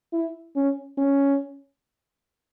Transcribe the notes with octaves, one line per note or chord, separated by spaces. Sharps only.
E4
C#4
C#4